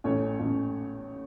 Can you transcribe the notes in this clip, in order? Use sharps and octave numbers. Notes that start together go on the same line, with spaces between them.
A1 A2 A3 C#4 C#5
A1 A2 A3 C#4